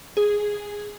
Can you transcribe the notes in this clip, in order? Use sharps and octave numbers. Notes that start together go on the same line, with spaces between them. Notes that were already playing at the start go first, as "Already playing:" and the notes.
G#4